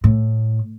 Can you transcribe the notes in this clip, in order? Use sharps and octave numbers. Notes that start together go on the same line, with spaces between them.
A2